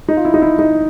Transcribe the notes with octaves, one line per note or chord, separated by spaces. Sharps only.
D#4
F4
E4
D#4
E4
D#4